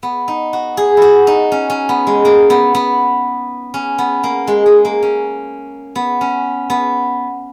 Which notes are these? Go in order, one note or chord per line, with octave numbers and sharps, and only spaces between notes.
B3
D#4
F#4
G#4
E4 F#4
D#4
C#4
C#4
B3
G#3
A#3
B3
B3
C#4
B3
A#3
G#3
G#3
A#3
C#4
B3
C#4
B3